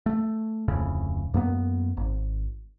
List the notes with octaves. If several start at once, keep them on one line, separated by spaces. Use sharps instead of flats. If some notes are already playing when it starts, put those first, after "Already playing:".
A3
D1 F2 A2 C#3
F#2 A#3 B3
G#1